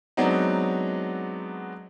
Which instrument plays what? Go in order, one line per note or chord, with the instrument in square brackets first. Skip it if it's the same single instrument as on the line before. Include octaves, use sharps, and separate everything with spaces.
[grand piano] F#3 G#3 B3 C4 D4 D#4